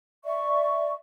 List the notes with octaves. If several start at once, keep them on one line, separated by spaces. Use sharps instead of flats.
D5 E5 C#6